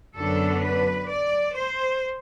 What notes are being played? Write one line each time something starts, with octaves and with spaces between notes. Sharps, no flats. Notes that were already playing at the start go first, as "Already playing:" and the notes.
F#2 D3 F#3 B3 D4 A4
B4
D5
C5